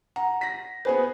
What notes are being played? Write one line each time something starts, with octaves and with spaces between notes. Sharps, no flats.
F#5 A#5
A#6 B6
B3 G#4 B4 C5